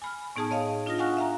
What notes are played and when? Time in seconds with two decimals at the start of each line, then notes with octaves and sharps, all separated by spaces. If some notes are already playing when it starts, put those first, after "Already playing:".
0.02 G#5 B5 F6
0.36 A2 B3 D#4 G#4 A5 D#6
0.51 C#5 D#5 F5
0.86 D4 F4 D#5 D#6 F6 A#6
0.98 F5 F#5 G#5 C#6 F6 F#6
1.17 E5 F5 A#5